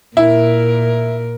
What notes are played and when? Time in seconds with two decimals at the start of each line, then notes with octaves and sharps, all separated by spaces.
0.17 A#2 E4 A#4